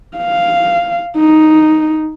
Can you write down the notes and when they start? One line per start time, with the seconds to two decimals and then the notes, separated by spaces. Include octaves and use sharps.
0.17 F5
1.18 D#4